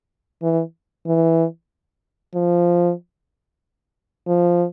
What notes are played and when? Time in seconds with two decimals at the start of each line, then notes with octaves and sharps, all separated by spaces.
0.42 E3
1.06 E3
2.35 F3
4.27 F3